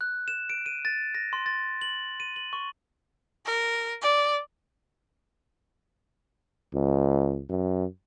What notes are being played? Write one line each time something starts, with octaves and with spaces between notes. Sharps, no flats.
F#6
E7
D7
D#7
A6
A#6
C6
A6
F#7
D#7
F#7
C#6
A#4
D5
C#2
F#2